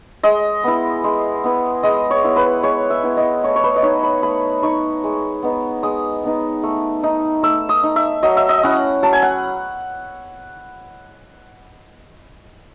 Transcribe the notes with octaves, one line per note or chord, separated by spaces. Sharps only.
G#3 D#5
B3 E4
G#3
B3 E4
G#3 D#5
C#5
B3 E4
B4
G#3 C#5
E5
B3 E4
D#5
A3 C#5
C#5
B4
D#5
D#4 C#5
B5
A3 B5
D#4 C#6
G#3
B3 D#4
G#3 D#6
B3 D#4
A3
D#4
A3 E6
D#6
D#4
E5
F#3 D#5
E5
D#5
C#4 E4 F#5
F#3 A5
G#5
F#5